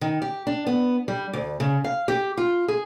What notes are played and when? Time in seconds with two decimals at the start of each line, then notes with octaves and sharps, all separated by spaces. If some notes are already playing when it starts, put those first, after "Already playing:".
0.01 D#3
0.22 G4
0.47 D4
0.67 B3
1.08 G3
1.33 D2
1.60 C#3
1.84 F5
2.08 G4
2.37 F4
2.68 G#4